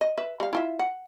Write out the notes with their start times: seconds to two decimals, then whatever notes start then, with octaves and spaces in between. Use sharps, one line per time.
0.01 D#5
0.17 B4 E5
0.40 G3 F5
0.53 E4 F4 E5
0.79 F#5